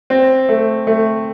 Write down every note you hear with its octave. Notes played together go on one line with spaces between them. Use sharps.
C4
A3
A3